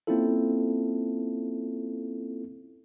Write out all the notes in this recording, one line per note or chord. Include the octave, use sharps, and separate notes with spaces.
A#3 C4 C#4 E4 F4 A4